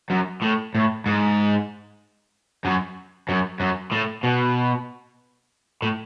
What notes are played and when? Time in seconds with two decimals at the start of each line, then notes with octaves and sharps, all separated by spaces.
0.10 F#2
0.42 A2
0.75 A2
1.06 G#2
2.65 F#2
3.29 F#2
3.60 F#2
3.92 A2
4.24 B2
5.82 A2